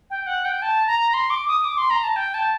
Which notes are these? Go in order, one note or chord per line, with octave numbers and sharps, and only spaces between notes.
G5
F#5
G5
A5
A#5
C6
D6
D#6
D6
C6
A#5
A5
G5
A5